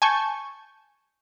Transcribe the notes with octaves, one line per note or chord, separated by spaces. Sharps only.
G#5 A5 C#6 G6